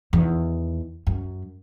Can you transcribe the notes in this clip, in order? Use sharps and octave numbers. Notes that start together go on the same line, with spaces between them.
E2 D#3
F#2